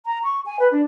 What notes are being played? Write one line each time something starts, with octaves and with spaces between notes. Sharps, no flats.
A#5
C#6
G#5
B4
D4